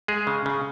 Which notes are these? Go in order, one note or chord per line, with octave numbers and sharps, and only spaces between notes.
G#3 G#4
C#3
C#3